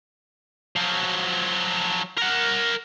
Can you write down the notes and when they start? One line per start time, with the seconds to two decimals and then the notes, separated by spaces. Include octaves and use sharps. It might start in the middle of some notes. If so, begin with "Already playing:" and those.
0.76 F3 F#3
2.18 A#4 F#5